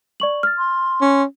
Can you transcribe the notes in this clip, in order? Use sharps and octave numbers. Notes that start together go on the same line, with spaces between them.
D5 C#6 F#7
F6 A6
C6
C#4